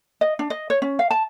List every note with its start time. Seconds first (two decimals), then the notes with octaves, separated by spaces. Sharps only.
0.21 D#5
0.39 D4
0.50 D#5
0.70 C#5
0.82 C#4
0.99 F5
1.11 A5